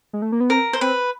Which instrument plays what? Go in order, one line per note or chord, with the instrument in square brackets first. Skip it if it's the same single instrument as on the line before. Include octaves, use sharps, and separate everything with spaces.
[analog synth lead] G#3
A3
A#3
B3
[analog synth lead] C4 [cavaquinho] A#4
[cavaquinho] C5
[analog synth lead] C4 [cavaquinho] B4